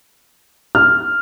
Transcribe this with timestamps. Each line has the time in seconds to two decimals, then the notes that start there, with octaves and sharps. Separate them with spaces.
0.75 F6